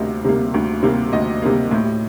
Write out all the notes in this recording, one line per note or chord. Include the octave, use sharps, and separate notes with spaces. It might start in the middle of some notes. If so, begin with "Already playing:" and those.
Already playing: D2 C3 G3 A#3 D#5
C3 G3 A#3
D2
C3 G3 A#3
D2 D#5
C3 G3 A#3
A2